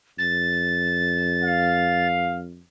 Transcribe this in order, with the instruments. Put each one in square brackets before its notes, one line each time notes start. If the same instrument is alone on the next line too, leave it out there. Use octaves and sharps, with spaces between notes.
[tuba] F2 [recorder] A6
[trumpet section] F5